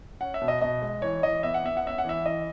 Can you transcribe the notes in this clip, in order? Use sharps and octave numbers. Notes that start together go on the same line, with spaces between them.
C#4 F#5
E5
B2
D#5
B2 D#5
G#3
E3 C#5
E3 D#5
B3 E5
F#5
B3 E5
F#5
C#4 E5
F#5
E3 E5
E3 D#5